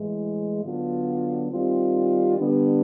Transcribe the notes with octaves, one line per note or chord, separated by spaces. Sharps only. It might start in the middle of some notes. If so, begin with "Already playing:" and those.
Already playing: A2 E3 G#3
D3 F#3 B3 D4 F4
D#3 G3 C4 F4
D3 G3 B3 D4